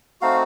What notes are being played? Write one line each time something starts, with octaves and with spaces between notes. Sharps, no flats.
A3 C4 D#4 F#4 F5